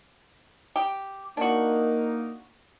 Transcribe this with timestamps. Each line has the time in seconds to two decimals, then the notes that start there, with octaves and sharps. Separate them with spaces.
0.76 G4
1.37 A#3 D4 D#4 F#4